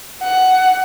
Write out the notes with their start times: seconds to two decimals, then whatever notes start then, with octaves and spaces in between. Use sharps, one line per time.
0.22 F#5